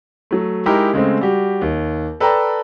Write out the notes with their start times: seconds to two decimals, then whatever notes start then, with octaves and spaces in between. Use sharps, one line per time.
0.31 F#3 A3
0.66 G#3 D#4 E4 G4 A#4
0.93 C#3 G#3 A3 C4
1.21 G3 F#4 G4
1.61 D#2
2.20 A4 B4 D5 G5 A5 A#5